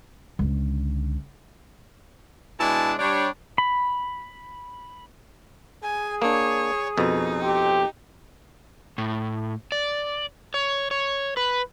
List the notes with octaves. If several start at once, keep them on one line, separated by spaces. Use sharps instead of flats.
C#2 D3
B2 G#3 D4 E4 G#5 A5
G3 D4 C#5
B5
G#4 G#5
A#3 D4 C#5
F2 B2 D#4
C4 G4
A2
D5
C#5
C#5
B4